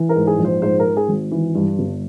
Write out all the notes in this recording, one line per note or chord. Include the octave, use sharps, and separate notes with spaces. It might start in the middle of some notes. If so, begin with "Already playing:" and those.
Already playing: E3
A#4
G#2
G#4
A#1
C5
G#2 C5
A#4
G#2
G#4
G#1
E3
G2
G1